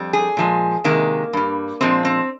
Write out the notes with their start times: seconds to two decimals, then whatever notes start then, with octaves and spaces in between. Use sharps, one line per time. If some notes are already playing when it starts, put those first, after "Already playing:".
Already playing: F2 G3
0.13 G#4
0.37 A#2 F3 G#3
0.84 C3 D#3 G#3 A#3
1.33 G2 G3
1.81 A#2 F3 G#3 C4
2.05 C4